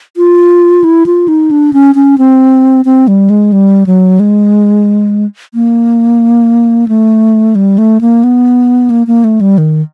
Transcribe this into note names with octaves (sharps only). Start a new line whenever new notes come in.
F4
E4
F4
D#4
D4
C#4
C#4
C4
C4
G3
G#3
G3
F#3
G#3
A#3
A3
G3
A3
A#3
B3
A#3
A#3
A3
G3
D#3